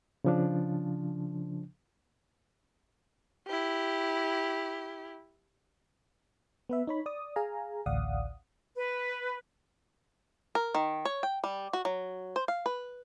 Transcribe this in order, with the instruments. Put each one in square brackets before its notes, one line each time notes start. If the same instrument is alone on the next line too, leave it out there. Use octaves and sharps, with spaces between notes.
[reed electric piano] C#3 F3 D4
[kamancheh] E4 G4
[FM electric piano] B3 B4 E5
D#4 C#5 B5
D5 D#6
G#4 F5 G#5 A#5
A1 D2 D5 F5 F#5 D#6
[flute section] B4
[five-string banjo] A#4
D#3
C#5
G5
G3
F#4
F#3
C5
F5
B4